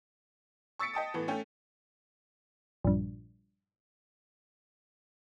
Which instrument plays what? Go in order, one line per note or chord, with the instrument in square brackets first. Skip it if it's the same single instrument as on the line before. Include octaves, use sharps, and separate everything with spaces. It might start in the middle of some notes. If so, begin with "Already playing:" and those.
[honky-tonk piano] C#6 E6 A6 B6 C#7 D7
D#5 G5 A5 D#6
A2 E3 B3
A3 C#4 G5
[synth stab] A#1 G2